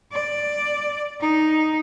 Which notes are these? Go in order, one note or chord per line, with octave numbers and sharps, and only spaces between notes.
D5
D#4